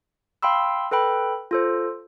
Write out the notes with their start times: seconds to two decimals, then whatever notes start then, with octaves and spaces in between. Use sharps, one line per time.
0.42 F5 G5 B5 C6 E6
0.91 A4 B4 G5 B5
1.51 F4 A4 C5